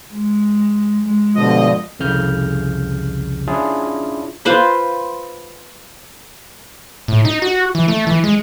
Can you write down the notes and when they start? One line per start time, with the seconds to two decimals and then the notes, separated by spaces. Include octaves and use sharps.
0.11 G#3
1.03 G#3
1.35 G2 B2 D3 F3 D#5
1.99 C2 F2 C#3 F6 G6
3.48 C#4 D4 E4 F4 G#4
4.45 F4 B4 C5 B5
7.08 A2
7.25 D#4
7.42 F#4
7.75 E3
7.88 A3
8.07 E3
8.24 G#3